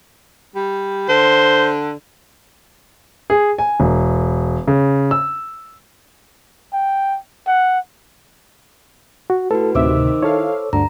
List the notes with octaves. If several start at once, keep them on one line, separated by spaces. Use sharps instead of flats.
G3
D3 C5
G#4
G#5
E1
C#3
E6
G5
F#5
F#4
A2 F#4 A4 B4
D2 A2 C3 D#3 C5 E5 D6 E6
E4 A4 C#5 F5
D2 G2 D3 A#5